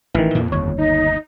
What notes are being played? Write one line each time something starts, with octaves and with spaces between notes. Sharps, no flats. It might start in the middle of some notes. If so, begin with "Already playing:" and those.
A1 D#3 E3
F2 A#2 A#3
G1 D#2 C#5
D#4 D#5